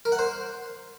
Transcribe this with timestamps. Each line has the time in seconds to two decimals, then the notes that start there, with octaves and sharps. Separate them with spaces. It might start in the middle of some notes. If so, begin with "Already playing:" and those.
0.05 A#4
0.12 F#5
0.19 C5